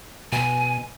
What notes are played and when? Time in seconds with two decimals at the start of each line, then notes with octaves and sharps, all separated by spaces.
0.32 B2 G#5